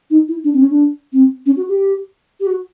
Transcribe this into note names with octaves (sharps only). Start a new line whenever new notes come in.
D#4
E4
D4
C4
C#4
D4
C4
C#4
F#4
G4
G4
F#4